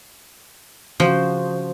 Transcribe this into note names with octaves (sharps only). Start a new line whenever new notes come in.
C#3 F3 F#4 C5